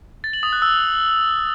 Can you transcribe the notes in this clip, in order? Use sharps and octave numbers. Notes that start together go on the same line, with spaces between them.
A6
F#7
D#6
F#6
E6